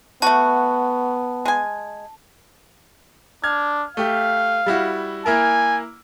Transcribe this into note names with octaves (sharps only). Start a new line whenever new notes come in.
A3 B3 F#4 A5
G#3 G#5
D4 F6 G#6
A3 G4 F5
G3 E4 F#4
A#3 E4 A#4 G#5